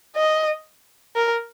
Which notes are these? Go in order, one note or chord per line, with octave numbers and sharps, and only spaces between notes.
D#5
A#4